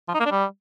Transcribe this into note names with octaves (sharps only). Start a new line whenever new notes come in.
F3
D#4
A#3
D4
G3